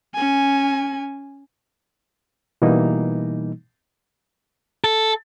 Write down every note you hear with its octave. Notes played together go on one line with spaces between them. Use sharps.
C#4 G#5
B2 E3 G3 A#3 D#4
A4